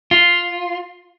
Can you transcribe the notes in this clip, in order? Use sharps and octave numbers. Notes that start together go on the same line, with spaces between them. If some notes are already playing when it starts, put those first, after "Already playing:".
F4